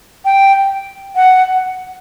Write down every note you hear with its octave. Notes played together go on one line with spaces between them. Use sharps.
G5
F#5